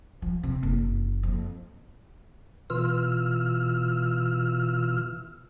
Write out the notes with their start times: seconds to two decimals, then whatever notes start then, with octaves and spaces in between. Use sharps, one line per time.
0.22 F3
0.43 C3
0.63 F#1
1.23 F2
2.70 B2 E3 F4 E6 F6